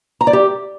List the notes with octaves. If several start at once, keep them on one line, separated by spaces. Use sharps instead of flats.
A#5
D5
G4